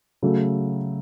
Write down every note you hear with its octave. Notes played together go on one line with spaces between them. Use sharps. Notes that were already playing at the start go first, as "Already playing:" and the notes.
C#3 F#3 A3